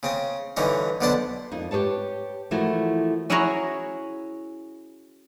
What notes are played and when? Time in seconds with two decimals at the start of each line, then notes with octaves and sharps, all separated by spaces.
0.03 C#3 C4 D#6
0.57 G2 D3 E3 C#4 D#4
1.01 B1 D3 B3 D4 C5 A5
1.52 F2 A#3 D#4
1.71 G4 G#4 B4 C#5 A5
2.51 E3 F3 A3 E4 F#4 A#4
3.30 C#4 E4 F#4 G#4 C#5 A#5